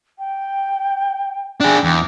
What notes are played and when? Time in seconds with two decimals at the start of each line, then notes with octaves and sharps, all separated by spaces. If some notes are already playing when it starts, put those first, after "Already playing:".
0.18 G5
1.60 D4 G#4 G5
1.84 E2